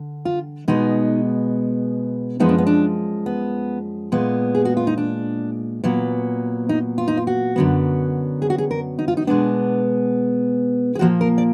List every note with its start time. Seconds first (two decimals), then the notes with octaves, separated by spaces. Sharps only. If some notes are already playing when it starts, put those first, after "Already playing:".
Already playing: D3
0.25 F4
0.68 B2 G#3 B3 D#4
2.40 F#2 F3 G#3 B3 D#4
2.49 D4
2.58 B3
2.67 D4
3.26 B3
4.12 A#2 G#3 B3
4.55 G#4
4.65 F#4
4.77 F4
4.87 D#4
4.98 D4
5.84 A#2 F#3 B3
6.69 D#4
6.98 F4
7.08 D#4
7.17 F4
7.27 F#4
7.56 F#2 D3 F#3 B3
8.42 G#4
8.50 F#4
8.58 G#4
8.71 A#4
8.99 D#4
9.08 F4
9.17 D#4
9.27 B2 G#3 B3 D4
10.95 G#4
10.99 A#2 F3 A#3 F#4
11.21 A#4
11.38 D5